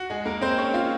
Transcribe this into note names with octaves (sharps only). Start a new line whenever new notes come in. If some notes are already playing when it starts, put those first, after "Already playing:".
Already playing: F#4
G#3 G#4
A#3 A#4
C4 C5
C#4 C#5
F4 F5